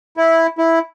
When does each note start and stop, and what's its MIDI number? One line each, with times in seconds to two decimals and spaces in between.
0.17 0.47 64
0.58 0.79 64